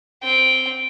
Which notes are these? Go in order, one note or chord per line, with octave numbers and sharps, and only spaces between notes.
C4 G5